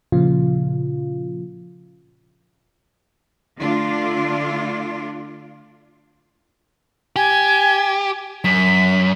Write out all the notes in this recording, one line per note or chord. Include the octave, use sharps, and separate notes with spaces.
A#2 C#3 F3 F4
D3 A3 D4 F4
G4 G#5
F#2 B6